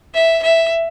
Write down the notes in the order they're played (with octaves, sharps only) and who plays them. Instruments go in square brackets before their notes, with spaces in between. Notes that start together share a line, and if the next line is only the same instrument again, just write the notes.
[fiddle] E5
E5